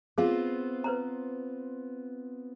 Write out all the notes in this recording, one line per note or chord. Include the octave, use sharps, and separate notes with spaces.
B3 C4 F4 G#4 F5
B4 C5 A#5